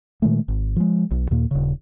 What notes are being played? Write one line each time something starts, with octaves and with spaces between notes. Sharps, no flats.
A#2 D#3 G#3 A3
G#1
F3 G#3
B1
D#2 A#2 A#3
D#1 C#3